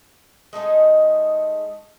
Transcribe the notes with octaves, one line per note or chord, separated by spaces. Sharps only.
G#3 A3 D#4 G#4